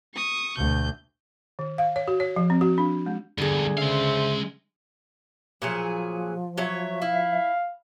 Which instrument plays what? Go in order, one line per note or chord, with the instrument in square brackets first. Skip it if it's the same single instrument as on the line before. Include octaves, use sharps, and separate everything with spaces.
[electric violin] C#6 D#6
[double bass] D2 B2 [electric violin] G6
[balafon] D#3
F5
C#5
F#4
C#5
F3
C4
F#4
D4
G#3
[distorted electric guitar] E2 G2 [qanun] D3 G#4
[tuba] C#3 [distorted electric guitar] G#3 F5 [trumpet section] C5 E5
[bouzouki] A#2 F#3 G#4 [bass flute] F3
[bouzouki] F#3 C#5 [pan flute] E5
[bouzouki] E4 [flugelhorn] F5